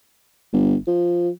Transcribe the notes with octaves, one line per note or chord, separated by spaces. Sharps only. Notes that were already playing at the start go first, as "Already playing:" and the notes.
G1
F3